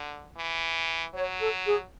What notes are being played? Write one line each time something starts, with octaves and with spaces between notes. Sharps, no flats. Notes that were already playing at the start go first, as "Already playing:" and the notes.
Already playing: D3
E3
F#3 C#5
A4
G#4